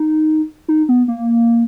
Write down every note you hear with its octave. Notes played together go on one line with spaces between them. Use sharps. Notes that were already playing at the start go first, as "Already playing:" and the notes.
Already playing: D#4
D#4
B3
A#3